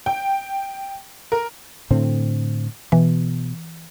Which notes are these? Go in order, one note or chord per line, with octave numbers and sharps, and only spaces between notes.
G5
A#4
A2 D3 C4
B2 E3